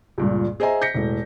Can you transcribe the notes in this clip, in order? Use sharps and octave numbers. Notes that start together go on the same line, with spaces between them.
C#2 G2 A#2
G#4 C5 D#5 E5 G#5 A#5
G6 A#6 B6 C#7
E1 A2